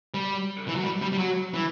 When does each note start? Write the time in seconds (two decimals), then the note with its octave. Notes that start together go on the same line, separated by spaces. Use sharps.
0.14 G3
0.68 E3
0.76 F#3
0.85 G3
1.01 G3
1.12 G3
1.18 F#3
1.54 E3